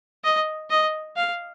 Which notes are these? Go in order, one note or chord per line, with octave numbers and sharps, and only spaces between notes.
D#5
D#5
F5